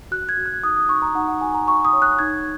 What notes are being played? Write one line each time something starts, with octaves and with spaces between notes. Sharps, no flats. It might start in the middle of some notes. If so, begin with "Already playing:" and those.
F#4 F#6
G#6
F#4
F#6
D#4 D#6
D#6
D#4 C#6
A#5
D#4 F#5
F#5
F#4 G#5
A#5
F#4 C#6
D#6
C#5
F#6
D#4 G#6